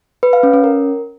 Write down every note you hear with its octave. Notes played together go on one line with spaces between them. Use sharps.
B4
F5
C#4
C#4
A#4